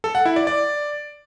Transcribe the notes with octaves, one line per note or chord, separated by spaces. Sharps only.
A4
F#5
E4
D5
D5